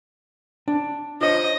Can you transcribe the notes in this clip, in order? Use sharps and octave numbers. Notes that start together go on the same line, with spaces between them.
D4
F4 C5 C#5 D#5